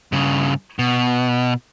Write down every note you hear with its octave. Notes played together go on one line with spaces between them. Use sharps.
G2 C#3
B2